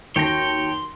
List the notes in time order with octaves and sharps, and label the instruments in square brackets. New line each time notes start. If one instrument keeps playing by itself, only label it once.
[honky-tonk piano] D#2 A5 A#6 [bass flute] F#4 [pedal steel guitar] C#5 G5 [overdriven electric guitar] C6